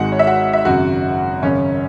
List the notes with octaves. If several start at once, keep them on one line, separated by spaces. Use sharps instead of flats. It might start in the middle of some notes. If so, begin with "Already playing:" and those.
Already playing: G#1 G#2 G#3 F#4 F#5
C#5
E5
F#4 F#5
E5
G#1 F#2 C#3 F#4 F#5
G#1 F#2 C#3 C#4 C#5